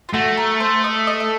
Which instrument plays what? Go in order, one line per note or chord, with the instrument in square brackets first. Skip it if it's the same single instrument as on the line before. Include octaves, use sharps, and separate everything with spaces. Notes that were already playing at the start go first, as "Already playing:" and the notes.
[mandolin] F4
[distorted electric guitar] A3 [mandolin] F#4
[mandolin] A#4
C5
D#5
D#5
E5